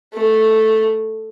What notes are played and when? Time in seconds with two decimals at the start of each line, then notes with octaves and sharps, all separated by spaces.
0.14 A3